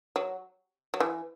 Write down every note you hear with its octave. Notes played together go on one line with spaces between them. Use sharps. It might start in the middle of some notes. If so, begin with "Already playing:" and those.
F#3
F#3
E3